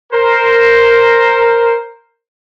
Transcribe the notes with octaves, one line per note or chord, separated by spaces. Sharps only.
A#4 C5